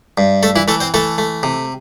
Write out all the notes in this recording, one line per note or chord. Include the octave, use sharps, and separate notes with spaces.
G2
A3 A4
E3 E4
E3 A3 A4
C4 C5
E3 A3 A4
A3
C3